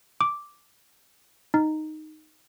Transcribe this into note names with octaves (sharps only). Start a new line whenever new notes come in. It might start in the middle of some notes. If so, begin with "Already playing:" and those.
D6
D#4